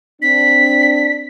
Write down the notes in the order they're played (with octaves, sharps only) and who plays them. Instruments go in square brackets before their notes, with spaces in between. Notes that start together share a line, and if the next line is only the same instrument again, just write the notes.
[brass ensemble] C4 D4 [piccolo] B6